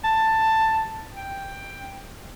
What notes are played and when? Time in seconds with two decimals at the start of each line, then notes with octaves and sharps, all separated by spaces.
0.04 A5
1.15 G5